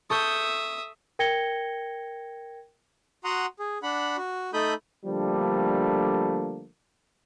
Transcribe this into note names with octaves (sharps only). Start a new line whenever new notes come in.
A4 E5 C#6 D#6 G6
A#4 G5 G#6 A#6 C#7 G7
F#4 F#5 A#5 C6 D#6
G#4
D4 F#5 B5
F#4
A3 D#4 A4 B5 D#6 G6
D3 F3 G3 A3 A#3 D4